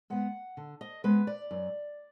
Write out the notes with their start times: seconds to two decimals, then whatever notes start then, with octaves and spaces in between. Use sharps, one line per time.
0.10 G#3 B3 F#5
0.57 D3
0.81 D#5
1.04 G#3 B3 B4
1.27 D5
1.51 F#2